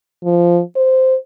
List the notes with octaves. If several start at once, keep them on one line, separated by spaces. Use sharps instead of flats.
F3
C5